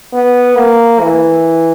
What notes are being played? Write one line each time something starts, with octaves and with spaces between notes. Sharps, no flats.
B3
A#3
E3